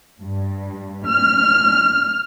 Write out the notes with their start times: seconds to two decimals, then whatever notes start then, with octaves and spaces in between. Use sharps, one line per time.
0.21 G2
1.08 F6